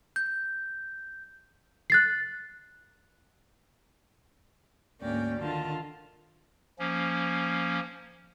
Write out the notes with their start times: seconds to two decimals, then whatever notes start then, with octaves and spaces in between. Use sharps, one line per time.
0.16 G6
1.90 F#6 A6 C7
5.01 D2 G#2 A#3 C#4 D5 G5
5.39 D3 D#3 F4 A5
6.79 F3 A#3 C#4